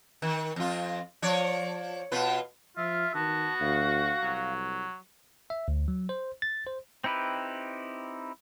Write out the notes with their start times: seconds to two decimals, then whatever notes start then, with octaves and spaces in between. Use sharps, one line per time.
0.22 D#3
0.56 F2 F4
1.22 F3 C#5 D5
2.12 B2 F4 B4
2.77 F3 F4 E5 F6
3.14 D#3 B3 F#4 A5
3.60 D2 F5
4.22 C2 F#3
5.50 E5
5.68 D2
5.88 F#3
6.09 C5
6.42 A6
6.67 C5
7.04 C4 D#4 E4 G4 B4